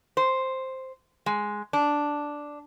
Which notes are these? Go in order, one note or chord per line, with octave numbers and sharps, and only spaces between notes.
C5
G#3
D4